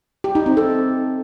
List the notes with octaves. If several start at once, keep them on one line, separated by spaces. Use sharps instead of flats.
G4
D#4
C4
A4